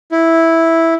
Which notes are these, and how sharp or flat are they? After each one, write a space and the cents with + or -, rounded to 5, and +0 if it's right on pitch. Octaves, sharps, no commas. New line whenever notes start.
E4 -5